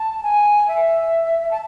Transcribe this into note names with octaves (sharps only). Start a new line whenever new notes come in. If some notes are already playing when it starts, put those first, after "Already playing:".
Already playing: A5
G#5
E5
A5